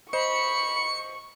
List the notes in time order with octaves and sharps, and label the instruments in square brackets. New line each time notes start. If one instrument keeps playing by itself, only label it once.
[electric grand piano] C5 D#5 [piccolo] B5 [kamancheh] C#6 [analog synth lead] C#7